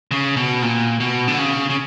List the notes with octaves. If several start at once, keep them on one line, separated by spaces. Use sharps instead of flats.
C#3
B2
A#2
B2
D3
C#3
C#3